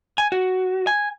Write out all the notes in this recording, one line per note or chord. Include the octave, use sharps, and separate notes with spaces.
G#5
F#4
G#5